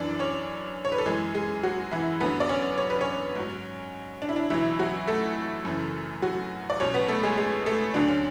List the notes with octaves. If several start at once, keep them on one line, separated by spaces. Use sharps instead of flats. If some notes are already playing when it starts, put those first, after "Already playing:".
Already playing: F#2 E3 D4 D5
C#4 C#5
C#5
B4
A4
F#2 E3 G#3 G#4
G#3 G#4
F#3 F#4
E3 E4
F#2 D3 F#3 B3 B4
D5
C#4 C#5
C#5
B4
C#4 C#5
G#2 F#3
D4
E4
D4
C#2 B2 E3 F#3 E4
F#3 F#4
A3 A4
F#2 C#3 E3
F#3 F#4
D5
C#2 B2 F#3 C#4 C#5
B3 B4
A3 A4
G#3 G#4
G#3 G#4
A3 A4
D2 D3 F#3 D4
C#4